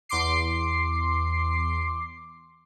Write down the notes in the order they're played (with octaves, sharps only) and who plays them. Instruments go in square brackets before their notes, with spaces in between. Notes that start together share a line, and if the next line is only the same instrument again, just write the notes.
[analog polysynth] E2 C6 D6 C7